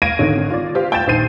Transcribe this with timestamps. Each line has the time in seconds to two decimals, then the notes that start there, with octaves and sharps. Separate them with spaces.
0.02 F5 G#6 A#6 D7 D#7
0.19 G#1 D3 D#3 C#5
0.50 F4 D5
0.75 F4 G4 C5 F5
0.92 G5 G6 A6 E7
1.07 A#1 D#3 C5 C7 D#7